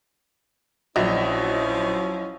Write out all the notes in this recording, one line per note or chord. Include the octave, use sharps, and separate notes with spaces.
A#1 F3 F#3 C#4 E4 D#5 E5